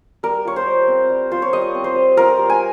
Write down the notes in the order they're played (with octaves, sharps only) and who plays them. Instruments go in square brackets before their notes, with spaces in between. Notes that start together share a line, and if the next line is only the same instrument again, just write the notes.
[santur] G3 A#4
F4 C#5
C5
G3
C4
G3
F4 C5
C#5
G3 D#5
C4
C5
G3
F4 A#4
G3
G#5